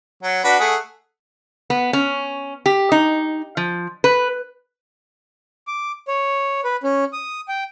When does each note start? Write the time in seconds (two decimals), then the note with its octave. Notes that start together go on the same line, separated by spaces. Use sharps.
0.23 F#3
0.44 D4 F#4 B4
0.59 A3 G#4 F#5
1.70 B3
1.93 C#4
2.66 G4
2.92 D#4
3.57 F3
4.04 B4
5.67 D6
6.08 C#5
6.64 B4
6.84 C#4
7.13 D#6
7.48 G5